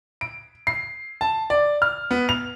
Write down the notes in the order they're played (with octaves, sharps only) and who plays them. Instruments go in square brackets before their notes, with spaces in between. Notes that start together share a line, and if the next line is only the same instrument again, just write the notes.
[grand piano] D7
C7
A5
D5
F6
B3
F7